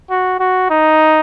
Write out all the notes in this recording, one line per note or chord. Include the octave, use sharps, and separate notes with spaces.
F#4
F#4
D#4